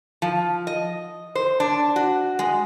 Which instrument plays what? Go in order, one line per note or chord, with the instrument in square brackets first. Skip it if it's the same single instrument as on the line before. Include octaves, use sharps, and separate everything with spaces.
[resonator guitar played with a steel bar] F3
D#5
C5
D4
F#4
G#3